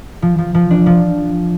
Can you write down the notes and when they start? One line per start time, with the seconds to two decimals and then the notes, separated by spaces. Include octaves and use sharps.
0.22 F3
0.39 F3
0.55 F3
0.71 D4
0.86 F3